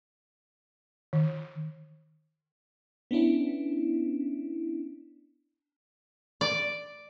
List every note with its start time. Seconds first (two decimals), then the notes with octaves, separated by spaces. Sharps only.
1.13 D#3
3.11 B3 C#4 D4 E4
6.41 D5